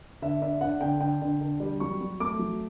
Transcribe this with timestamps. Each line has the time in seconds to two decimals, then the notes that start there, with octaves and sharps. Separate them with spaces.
0.22 D3 E5
0.42 D4 E5
0.61 D4 F#5
0.81 D3 G5
1.01 D3 G5
1.22 D3
1.41 D3
1.60 G3
1.80 F#3 C#6
2.01 F#3
2.20 A3 D6
2.39 F#3